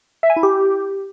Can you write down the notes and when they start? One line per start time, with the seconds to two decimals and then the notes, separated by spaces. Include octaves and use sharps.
0.23 E5
0.30 G#5
0.36 E4
0.43 G4